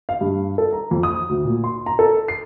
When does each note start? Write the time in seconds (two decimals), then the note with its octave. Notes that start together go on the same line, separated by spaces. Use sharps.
0.09 F5
0.21 G2
0.58 A4
0.73 A#5
0.91 F2
1.03 D#6
1.29 D2
1.45 A#2
1.64 C6
1.86 A#5
1.99 A4
2.28 C7